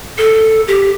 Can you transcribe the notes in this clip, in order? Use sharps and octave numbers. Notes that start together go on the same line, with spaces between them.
A4
G4